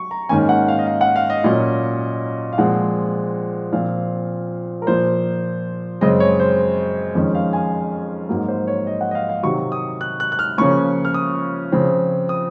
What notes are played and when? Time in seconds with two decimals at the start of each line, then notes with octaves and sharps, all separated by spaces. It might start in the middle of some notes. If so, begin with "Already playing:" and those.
Already playing: F#3 C#6
0.11 A#5
0.29 G#2 D#3 A#3 C#4 G#5
0.49 F#5
0.68 F5
0.79 D#5
0.87 F5
1.01 F#5
1.16 F5
1.30 D#5
1.44 A#2 F#3 C#4
2.53 F5
2.58 A#2 F3 G#3 C4 F#5
3.73 A#2 F3 C4 F5
4.82 A#4
4.87 A#2 F3 A#3 C5
6.01 F#2 C#3 G#3 C4 D#5
6.20 C#5
6.40 C5
7.15 F2 D#3 G#3 C#4
7.35 F5
7.53 G#5
8.29 G#2 F#3 A#3
8.48 C5
8.67 C#5
8.87 D#5
9.01 F#5
9.11 D#5
9.15 F5
9.29 F5
9.43 C3 D#3 F#3 C#6
9.72 D#6
10.01 F#6
10.20 F#6
10.32 F#6
10.39 F6
10.58 C#3 F3 A#3 C#4 C#6
11.05 F6
11.14 D#6
11.72 C#3 F3 C4
12.29 D#6